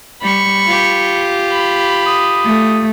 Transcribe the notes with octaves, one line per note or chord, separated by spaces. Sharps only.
G3 B5 C#6
F4 G4
B5
D#6
A3